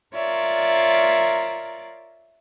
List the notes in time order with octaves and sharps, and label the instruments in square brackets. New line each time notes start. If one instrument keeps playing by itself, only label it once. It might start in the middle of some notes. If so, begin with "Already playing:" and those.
[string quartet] F4 A#4 C#5 D5 E5